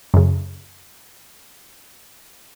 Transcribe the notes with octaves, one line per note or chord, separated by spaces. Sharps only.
F#2 C#3